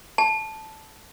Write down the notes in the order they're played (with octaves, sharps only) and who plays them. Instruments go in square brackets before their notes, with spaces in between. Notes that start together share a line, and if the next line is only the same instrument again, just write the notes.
[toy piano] A5